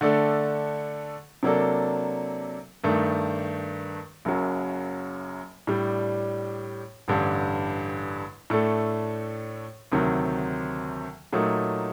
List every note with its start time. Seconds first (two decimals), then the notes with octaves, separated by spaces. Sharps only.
0.01 D3 A3 D4 A4
1.43 C3 F#3 A#3 D4 A4
2.84 G2 D#3 A3 D4
4.25 F#1 F#2 F#3
5.67 A2 G3 D4
7.08 A1 G2 D3 G3
8.50 A2 A3 D4 A4
9.92 D2 C3 D#3 F#3
11.33 A#2 F#3 A3 D#4